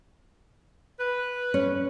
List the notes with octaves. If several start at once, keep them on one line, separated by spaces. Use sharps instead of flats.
B4
C#4